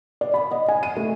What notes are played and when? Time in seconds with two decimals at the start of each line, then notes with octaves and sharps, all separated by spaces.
0.21 D5
0.34 B5
0.51 D#5
0.68 G#5
0.83 D#7
0.97 A3